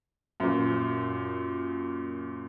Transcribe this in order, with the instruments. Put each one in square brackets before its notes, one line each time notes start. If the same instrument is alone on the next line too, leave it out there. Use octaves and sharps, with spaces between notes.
[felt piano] F#2 A#2